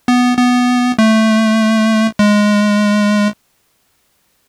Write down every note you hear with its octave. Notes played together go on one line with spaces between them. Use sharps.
B3
B3
A3
G#3